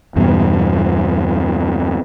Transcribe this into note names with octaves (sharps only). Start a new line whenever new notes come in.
E2 G2 B2